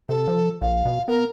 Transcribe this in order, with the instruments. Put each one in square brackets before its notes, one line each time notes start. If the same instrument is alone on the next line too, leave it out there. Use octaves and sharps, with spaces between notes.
[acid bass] C3 [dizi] A4
[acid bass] F3
[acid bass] A#1 [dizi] F5
[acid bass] B2
[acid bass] B3 [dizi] A#4